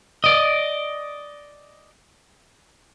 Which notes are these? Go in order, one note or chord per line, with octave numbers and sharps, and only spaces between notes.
D5 D#5